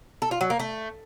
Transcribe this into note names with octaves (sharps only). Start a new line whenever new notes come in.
A4
F4
F#3
A#3
A3